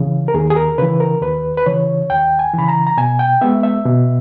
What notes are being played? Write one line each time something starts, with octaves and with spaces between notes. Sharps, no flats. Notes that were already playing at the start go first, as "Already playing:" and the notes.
Already playing: C#3 E3
A#4
D#2 G#4
G#4
A#4
C#3 E3 B4
A#4
D#2 B4
B4
C#3 E3 C#5
D#2 G5
G#5
C#3 E3 B5
A#5
A#5
B2 G#5
G5
G#3 B3 E5
E5
B2